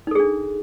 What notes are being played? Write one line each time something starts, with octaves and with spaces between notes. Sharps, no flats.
D4 D#4 G#4 A4